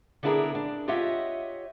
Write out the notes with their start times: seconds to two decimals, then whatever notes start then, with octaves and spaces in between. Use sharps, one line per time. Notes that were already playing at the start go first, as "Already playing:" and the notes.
0.23 D3 B3 D4 E4 G#4 A#4
0.55 D4
0.88 F4 G4 C#5 D#5 E5 F#5